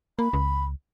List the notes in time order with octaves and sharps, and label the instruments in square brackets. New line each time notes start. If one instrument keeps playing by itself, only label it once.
[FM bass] A#3 [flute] B5
[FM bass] C#2